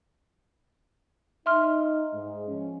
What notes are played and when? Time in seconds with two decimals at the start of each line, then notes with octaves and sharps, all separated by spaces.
1.46 D#4 E5 C6 F6
2.14 G#2 G#3
2.48 F3 C#4